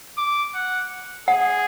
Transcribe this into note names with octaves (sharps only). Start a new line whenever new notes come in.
D6
F#5
G#4 F#5